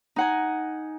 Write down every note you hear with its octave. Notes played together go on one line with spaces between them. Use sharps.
D#4 F#5 G#5